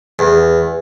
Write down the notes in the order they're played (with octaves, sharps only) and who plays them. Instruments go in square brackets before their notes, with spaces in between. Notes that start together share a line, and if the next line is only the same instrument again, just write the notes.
[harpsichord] E2